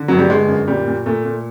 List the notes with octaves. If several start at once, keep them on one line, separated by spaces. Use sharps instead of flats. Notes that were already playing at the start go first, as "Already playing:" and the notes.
Already playing: D3
G1 F#3
G3
D3 G#3
F#2
A#2 G3
A#2
A#2 A3
A#2